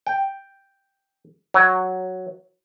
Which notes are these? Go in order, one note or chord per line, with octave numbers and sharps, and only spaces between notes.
G5
F#3